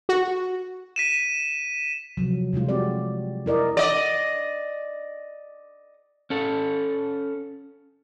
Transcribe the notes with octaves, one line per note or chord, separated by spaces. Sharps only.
F#4
B6 D#7 E7
C3 F3 F#3
C3 G3 G#3 F4
C4 F#4 G4 D5
E4 A#4 D5 D#5
D5 D#5
C#4 A4